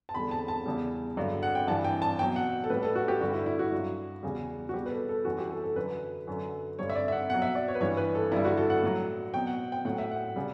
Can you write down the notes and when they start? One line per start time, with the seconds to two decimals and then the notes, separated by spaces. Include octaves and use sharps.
0.09 A5
0.14 E2 D3 G3 B5
0.31 A5
0.48 A5
0.66 E2 C#3 G3
1.17 G2 D3 F#3
1.43 F#5
1.55 G5
1.68 G2 E3 G3 A5
1.84 G5
2.02 A5
2.19 B2 F#3 G5
2.36 F#5
2.64 A4
2.70 A2 G3 B4
2.83 A4
2.95 F#4
3.08 G4
3.21 G2 D3 G3 F#4
3.34 E4
3.46 E4
3.59 F#4
3.72 G2 F#3
4.23 E2 C#3 G3
4.69 F#4
4.74 B2 G3 G4
4.86 B4
4.91 A4
5.09 A4
5.25 F#2 E3 G3 F#4
5.38 G4
5.51 A4
5.64 A4
5.76 F#2 D3 F#3 B4
6.27 F#2 D3 F#3
6.79 G2 D3 G3 C#5
6.90 E5
6.95 D5
7.08 E5
7.12 F#5
7.30 B2 F#3 F#5
7.42 E5
7.55 D5
7.68 C#5
7.75 B4
7.81 G2 E3 G3 C#5
7.97 B4
8.15 A4
8.32 G2 D3 G3 E4
8.45 F#4
8.57 A4
8.70 F#5
8.83 A2 F#3
9.33 B2 F#3 G5
9.47 F#5
9.72 G5
9.85 A2 F#3 F#5
9.98 E5
10.11 F#5
10.36 C#3 G3